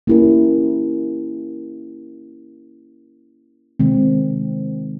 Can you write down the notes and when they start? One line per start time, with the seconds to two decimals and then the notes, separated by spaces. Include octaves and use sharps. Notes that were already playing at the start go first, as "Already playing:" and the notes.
0.07 A#3 C#4 E4 G4 A#4
3.80 C3 D#3 G#3 C4